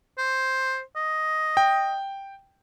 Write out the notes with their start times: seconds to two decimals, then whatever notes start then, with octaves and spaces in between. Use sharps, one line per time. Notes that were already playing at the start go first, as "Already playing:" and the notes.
0.18 C5
0.96 D#5
1.57 G5